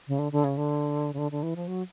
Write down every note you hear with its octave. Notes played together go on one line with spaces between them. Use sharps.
C#3
D3
D3
C#3
D3
C#3
D3
D3
E3
F3
F#3